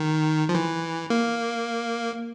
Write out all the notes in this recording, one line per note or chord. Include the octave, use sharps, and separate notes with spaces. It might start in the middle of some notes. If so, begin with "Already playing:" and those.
Already playing: D#3
F3
E3
A#3